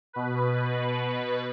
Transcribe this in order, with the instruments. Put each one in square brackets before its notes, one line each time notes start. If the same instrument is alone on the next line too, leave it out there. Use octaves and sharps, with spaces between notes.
[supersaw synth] B2 B4